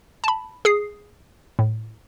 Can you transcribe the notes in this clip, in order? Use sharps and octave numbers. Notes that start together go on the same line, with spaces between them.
A5 B5
G#4 D#6 C7
A2